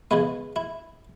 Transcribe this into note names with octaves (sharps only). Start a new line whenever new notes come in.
C#3 E3 G#3 B3 E4
E4